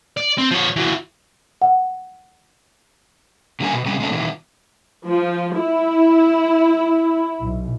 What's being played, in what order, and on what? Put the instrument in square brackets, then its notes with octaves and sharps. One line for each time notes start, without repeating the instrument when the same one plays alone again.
[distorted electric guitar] D5
C4
F3 C#5
E3 F#3
[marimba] F#5
[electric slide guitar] B2 D3 G3 A#3 C#4 G#5
B2
C3 G3 G#3 C#4
G#3 A3 C#4 D4
B2 D#3 E3
[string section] F3
E4
B1